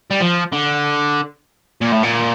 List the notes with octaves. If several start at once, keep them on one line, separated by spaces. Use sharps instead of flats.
G3
F3
D3
A#2
A2
A#2